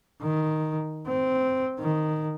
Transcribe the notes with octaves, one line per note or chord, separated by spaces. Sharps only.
D#3
C4
D#3